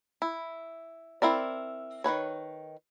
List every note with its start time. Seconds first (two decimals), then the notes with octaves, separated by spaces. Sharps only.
0.22 E4
1.22 C4 E4 A#4 D5
2.04 D#3 E3 B4 C#5